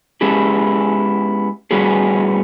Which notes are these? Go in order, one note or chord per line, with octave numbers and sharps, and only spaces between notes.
G#3 B3 C#4 E4 G4 G#4
A2 G3 B3 C#4 F#4 G#4